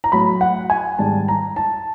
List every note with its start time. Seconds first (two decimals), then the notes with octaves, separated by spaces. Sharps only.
0.04 A#5
0.12 A2 F#3 B5
0.41 F#5
0.70 G#5
0.99 G#2 D#3 G3 A5
1.28 A#5
1.56 A5